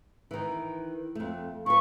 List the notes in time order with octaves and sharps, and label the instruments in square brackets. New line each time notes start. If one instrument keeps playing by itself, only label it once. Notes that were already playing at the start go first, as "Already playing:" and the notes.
[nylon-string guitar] D#3 E3
F2 A3
[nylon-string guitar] F3 B4 [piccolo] C#6